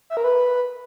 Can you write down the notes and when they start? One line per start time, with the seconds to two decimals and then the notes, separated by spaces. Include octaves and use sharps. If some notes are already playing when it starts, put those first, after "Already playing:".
0.10 E5
0.17 A#4
0.24 B4